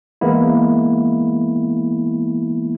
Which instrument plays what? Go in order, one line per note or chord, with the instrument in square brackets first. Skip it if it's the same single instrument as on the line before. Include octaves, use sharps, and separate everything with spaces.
[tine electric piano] E3 G#3 A#3 B3 E4